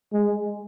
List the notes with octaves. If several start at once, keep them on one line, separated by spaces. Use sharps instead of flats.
G#3